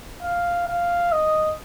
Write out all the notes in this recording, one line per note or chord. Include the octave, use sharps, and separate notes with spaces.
F5
F5
D#5